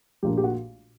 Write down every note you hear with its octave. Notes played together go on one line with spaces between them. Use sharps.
A#1 A#2 A#3 D4 G4
G4
F#4